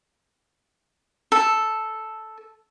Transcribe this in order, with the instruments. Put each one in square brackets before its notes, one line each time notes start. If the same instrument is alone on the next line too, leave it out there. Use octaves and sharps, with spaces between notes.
[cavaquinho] A4